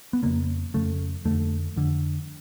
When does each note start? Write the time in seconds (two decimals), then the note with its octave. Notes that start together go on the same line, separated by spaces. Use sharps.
0.13 B3
0.23 F2 C#3 A#3
0.74 F2 C#3 A3
1.25 F2 D3 A3
1.76 F2 D3